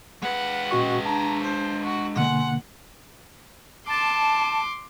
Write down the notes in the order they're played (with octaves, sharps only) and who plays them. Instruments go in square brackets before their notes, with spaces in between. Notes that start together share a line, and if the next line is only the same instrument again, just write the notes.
[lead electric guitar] G#3 B4 [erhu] F#5
[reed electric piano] A#2 F#4 C#6 [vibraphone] C#4 D#5 G5
[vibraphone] D4 [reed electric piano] A5 [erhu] A#5
[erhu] C5
F#4
[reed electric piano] B2 D3 A#3 [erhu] F#5 [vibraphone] G#5 C6
[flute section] A5 [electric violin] C6 D6